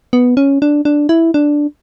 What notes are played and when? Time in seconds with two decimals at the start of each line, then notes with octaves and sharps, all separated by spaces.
0.13 B3
0.37 C#4
0.62 D4
0.85 D4
1.09 E4
1.34 D4